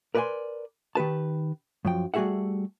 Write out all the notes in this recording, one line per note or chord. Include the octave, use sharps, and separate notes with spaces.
A#4 B4 D5 F5 G#5 C6
D#3 G4 B4 A5
F#2 F3 G5
G3 A3 F#4 G#4 E5 F#5